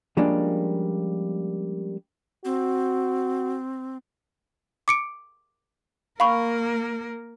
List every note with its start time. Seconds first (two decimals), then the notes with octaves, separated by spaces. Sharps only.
0.17 F3 G3 G#3 A#3 C#4 D4
2.45 C4 F#4
4.88 D6 C#7 D7
6.20 A#3 A#4 F5 B5 C#6